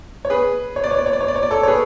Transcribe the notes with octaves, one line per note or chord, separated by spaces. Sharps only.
C#5
G#4 B4
C#5
D5
C#5
D5
C#5
D5
C#5
D5
C#5
D5
A4 C#5
C#5
G#4 B4